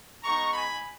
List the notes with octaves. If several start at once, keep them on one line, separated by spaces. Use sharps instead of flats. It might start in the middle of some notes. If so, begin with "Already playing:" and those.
G#3 B3 D#4 A#5 C#6
G#5 B5